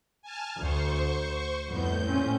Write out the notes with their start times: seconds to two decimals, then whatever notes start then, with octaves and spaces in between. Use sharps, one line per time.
0.22 G#5 A5 F6
0.59 D2 C5 C#6
1.67 F2 A2 G3 B3 G6
2.07 A#2 C4 C#4